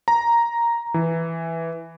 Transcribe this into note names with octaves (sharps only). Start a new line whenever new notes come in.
A#5
E3